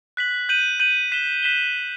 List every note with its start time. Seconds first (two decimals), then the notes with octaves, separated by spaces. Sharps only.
0.17 F#6 B6 F#7
0.49 G6 D#7 F#7
0.80 G6 D#7 F#7
1.12 F#6 B6 E7 G7
1.43 F#6 B6 E7 G7